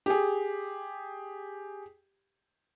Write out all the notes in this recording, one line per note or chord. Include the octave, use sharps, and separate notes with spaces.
G4 G#4